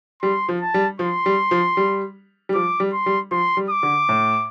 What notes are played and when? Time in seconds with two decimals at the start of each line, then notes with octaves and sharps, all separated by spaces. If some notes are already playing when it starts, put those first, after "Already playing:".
0.22 G3 C6
0.49 F3
0.61 A5
0.74 G3
0.99 F3 C6
1.26 G3
1.51 F3
1.77 G3
2.49 G3
2.54 F3 D6
2.80 G3
2.93 C6
3.06 G3
3.31 F3 C6
3.57 G3
3.70 D6
3.83 D3
4.09 A2